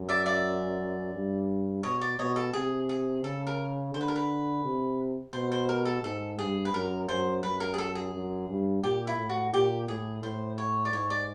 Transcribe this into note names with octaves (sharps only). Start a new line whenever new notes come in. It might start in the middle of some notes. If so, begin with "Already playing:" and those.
Already playing: F#2
D5 E5
D5 E5
G2
B2 C#5 D#5
D5
B2 C#5 D#5
A4
C3 G#4
G#4
C#3 A4
A#4
D3 C5
B4
A#4
B4
C3
B2 C5
C5
A#4
A4
G#2 A4
G2 G#4
B4
F#2 A#4
F#2 C5
F#2 B4
A#4
G#4
A4
G#4
F#2
G2
A#2 G4
E4
A2
F#4
A#2 G4
A2 G#4
A2 C5
C#5
D5
G#2 C#5
D5